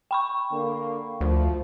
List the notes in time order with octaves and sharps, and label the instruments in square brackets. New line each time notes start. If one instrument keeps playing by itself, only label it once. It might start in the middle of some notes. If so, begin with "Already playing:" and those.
[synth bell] G5 B5 C#6
[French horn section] D3 A#3
[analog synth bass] D2 [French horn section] F3